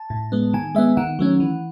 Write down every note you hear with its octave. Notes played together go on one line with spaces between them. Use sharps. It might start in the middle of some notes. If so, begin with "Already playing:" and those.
Already playing: A5
A2
G#3 B3
D#3 G#5
G#3 B3 E5
D#3 F#5
F#3 A3 C#4
E3